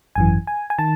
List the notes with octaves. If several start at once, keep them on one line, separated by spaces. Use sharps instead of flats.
G#1 F#2 E3 G#5
G#5
G#5
D#3 A5